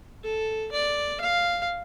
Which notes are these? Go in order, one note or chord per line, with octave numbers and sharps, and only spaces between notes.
A4
D5
F5